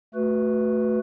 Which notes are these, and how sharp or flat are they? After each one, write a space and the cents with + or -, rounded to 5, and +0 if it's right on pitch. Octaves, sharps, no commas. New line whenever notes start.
A3 +0 F#4 +0 B4 +0